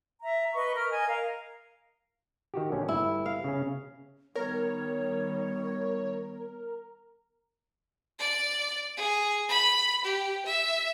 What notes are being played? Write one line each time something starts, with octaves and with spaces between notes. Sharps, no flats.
E5 A#5
B4 D#5 C#6
A#4 F6
D#5 G#5
A#4 F5
D#3 F#4 G4
A#1 D3 C#4
G1 E4
F5
C#3 C#4
D#3 G3 B3 A#4 C#5
D5
G#4
B5
G4
E5